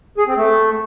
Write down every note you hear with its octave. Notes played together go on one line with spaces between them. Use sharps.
G#4
C4
A3